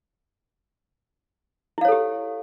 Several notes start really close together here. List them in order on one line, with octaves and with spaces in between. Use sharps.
E4 F5 C#5 A4 G4